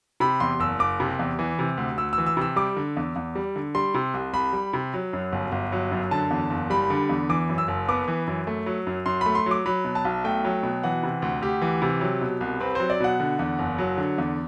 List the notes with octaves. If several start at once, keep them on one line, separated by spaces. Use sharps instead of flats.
C3 B5
E2 C6
F#1 E6
F#1 D6
C3
E2
E3
C3
D2
D2 E6
E6
E3
E6
C3 E6
G3 D6
D3
E2
E2
G3
D3
G3 C6
C3
C2
C2 B5
G3
C3
F#3
F#2
G1
G1
F#3
F#2
D3 A5
E2
F#1
G3 B5
D3
E2
E3 D6
F#2
E6
F#1
B3 D6
E3
F#2
A3
F#3
F#2
F#2 C6
A3 B5
C6
F#3 D6
F#3 B5
B2
A5
B1
A3 G5
F#3
B2
E3 F#5
C3
D2
D2 G4
E3
C3
F#3
B2
C2
C4 B4
F#3 C5
D5
B2 F#5
D3
E2
F#1
F#3
D3
E2